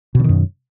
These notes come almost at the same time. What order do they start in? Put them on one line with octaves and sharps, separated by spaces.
B2 D3 D#3 F#2